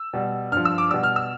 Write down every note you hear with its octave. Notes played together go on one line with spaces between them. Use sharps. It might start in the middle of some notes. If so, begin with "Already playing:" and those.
Already playing: E6
B2 G3
G2 F3 F6
E6
D6
B2 G3 E6
F6
E6